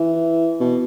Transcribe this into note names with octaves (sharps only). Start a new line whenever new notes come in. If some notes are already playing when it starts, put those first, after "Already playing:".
Already playing: E3
B2